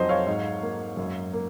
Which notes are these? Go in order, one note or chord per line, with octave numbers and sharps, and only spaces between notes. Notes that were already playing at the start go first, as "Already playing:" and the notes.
Already playing: F2 F#3 C5 D#5
C#5 F5
G#2
A#3
F#2
A#3